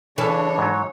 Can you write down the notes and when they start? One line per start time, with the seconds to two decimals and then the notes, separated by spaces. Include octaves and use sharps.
0.18 C#3 E3 C#4 D4 A4 C#5 G#5
0.58 G#2 F#3